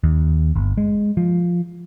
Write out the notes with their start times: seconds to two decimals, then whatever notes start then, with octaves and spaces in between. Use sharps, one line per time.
0.04 D#2
0.55 G1
0.77 G#3
1.17 F3